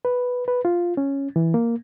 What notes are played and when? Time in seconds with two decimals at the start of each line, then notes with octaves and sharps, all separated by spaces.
0.05 B4
0.48 B4
0.65 F4
0.97 C#4
1.36 E3
1.54 A#3